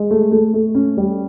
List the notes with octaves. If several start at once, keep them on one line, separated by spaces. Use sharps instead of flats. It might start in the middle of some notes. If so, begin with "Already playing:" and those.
Already playing: G#3
A3
A3
A3
C#4
G3